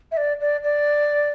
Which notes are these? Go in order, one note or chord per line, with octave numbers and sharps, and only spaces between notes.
E5
D5
D5
D5